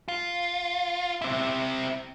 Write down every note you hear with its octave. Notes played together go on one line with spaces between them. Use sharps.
F4
C4 E4